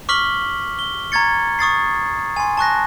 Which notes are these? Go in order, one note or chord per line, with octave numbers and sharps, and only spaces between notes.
C#6 D6 F6 B6 F#7 G7
G7
A#5 C#6 G#6 A6 C#7
C#6 D#6 A6 C7
G#5 C6
A5 C#6 F#6 A#6